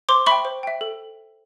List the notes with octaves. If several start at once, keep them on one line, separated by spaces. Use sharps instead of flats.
C5 C6 D6
E5 G5 B5 C#6
C5
E5 G5
A4